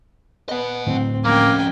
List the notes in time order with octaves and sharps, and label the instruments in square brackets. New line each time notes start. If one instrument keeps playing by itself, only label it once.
[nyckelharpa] B3 [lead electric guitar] D#5 F#5
[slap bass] A2 D3 F#3 [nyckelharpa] C4
[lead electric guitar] F3 C#4 [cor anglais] A#3 [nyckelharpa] G5 G#5